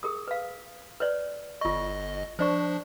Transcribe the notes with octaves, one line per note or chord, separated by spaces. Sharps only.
G#4 A#4 D#6
B4 F5
B4 C#5 D5
G1 F4 D#5 C#6
F3 D4 C5 D5 C#6